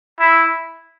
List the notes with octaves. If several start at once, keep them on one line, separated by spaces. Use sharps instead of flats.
E4